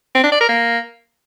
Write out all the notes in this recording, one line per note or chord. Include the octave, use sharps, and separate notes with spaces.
C4
D4
D5
A#4
A#3